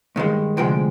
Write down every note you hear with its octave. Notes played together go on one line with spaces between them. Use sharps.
G2 D#3 G#3
D2 C3 F3 G#3 G5